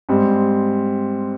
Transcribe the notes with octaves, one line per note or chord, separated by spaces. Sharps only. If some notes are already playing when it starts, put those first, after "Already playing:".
G#2 G3 C4